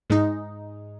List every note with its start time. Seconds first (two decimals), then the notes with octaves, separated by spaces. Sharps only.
0.10 G#2 G#3 D#4